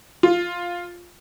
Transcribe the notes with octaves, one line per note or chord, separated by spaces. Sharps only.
F4